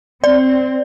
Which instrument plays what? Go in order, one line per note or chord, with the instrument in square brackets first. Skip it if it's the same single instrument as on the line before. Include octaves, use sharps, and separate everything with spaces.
[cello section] C4 [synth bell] D5